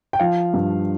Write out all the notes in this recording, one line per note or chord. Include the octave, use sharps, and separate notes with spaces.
G5
F3 F5
G2